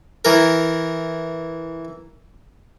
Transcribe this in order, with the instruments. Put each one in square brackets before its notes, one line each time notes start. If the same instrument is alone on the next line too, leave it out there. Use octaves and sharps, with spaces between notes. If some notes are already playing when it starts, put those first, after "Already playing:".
[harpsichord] E3 A#4